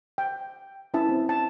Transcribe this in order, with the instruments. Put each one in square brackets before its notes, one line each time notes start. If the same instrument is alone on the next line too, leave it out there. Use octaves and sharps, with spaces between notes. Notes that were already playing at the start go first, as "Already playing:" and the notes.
[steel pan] G5
C#4 E4 E5 A5
C4
A5